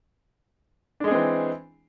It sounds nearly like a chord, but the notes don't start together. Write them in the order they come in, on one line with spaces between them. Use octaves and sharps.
D4 G#3 G#4 C4 E3